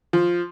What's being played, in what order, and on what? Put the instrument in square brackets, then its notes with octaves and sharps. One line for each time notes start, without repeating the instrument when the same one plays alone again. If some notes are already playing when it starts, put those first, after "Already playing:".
[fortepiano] F3